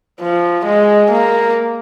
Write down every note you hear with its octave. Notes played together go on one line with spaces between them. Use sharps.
F3
G#3
A#3